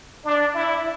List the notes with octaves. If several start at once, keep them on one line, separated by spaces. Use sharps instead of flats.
D4
E4